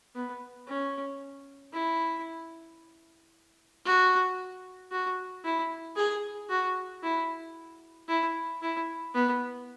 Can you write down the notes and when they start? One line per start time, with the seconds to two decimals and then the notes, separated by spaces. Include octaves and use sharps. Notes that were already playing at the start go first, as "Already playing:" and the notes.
0.15 B3
0.67 C#4
1.73 E4
3.85 F#4
4.92 F#4
5.45 E4
5.96 G#4
6.50 F#4
7.03 E4
8.08 E4
8.62 E4
9.14 B3